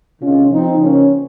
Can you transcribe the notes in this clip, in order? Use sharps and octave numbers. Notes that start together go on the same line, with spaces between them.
C3 D#3 G#3 C#4 F4
F3 C4 D#4
C#3 F3 A#3 C#4